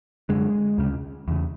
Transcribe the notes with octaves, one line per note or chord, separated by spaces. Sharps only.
F#2 D3 G#3
D2 C#3
E2 C#3